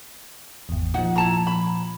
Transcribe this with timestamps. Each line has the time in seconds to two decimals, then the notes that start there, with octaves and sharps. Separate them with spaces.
0.69 G#1 E2
0.94 A#2 F3 D#4 F#5
1.16 E4 A5 A#5
1.47 B5